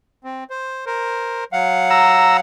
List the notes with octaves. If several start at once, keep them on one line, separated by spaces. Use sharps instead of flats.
C4
C5
A#4 C5
F#3 F5 F#5
A#5 E6